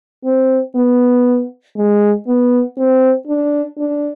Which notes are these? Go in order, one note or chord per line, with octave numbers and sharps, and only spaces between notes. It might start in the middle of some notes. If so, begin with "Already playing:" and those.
C4
B3
G#3
B3
C4
D4
D4